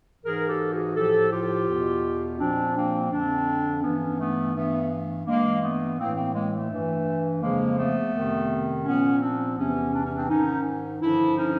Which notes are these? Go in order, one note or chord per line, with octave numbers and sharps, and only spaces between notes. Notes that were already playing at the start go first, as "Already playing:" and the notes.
G#2 E3 G#4 A#4
G4 A4
F#4 G#4
A2 F3 G4 A4
F4 G4
E2 B2
A#2 F3 C4 D4
A#3 C4
F2 D3 F3 C4 D4
G2 E3 B3 C#4
A3 B3
G2 E3 A3 B3
G2 E3 G#3 A#3
A3 B3
A2 E3 A#3 C4
A#3 C4
G#3 A#3
A3
G2 E3
F2 C#3 F3 G#3 A#3
A3 B3
F2 C3 D#3
A#2 F3 B3 C#4
C4 D4
E2 C3 E3 B3 C#4
D4
C#4
C4 D4
G#2 D#3 C#4 D#4
G2 D3 F3 D4 E4
C#4 D#4